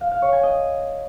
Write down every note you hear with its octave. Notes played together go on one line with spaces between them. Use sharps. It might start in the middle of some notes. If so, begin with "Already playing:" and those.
F5
F5
C#5
G#5
D#5